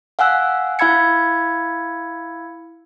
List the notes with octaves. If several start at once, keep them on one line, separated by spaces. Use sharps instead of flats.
F5 F#5 G#5 E6 F#6
E4 F5 B5 E6 G#6 C#7